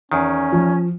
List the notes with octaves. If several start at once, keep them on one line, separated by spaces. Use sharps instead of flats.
E2 D#3 C#4
F3